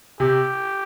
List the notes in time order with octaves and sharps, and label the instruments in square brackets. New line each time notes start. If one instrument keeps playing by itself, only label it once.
[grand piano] C3 [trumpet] G4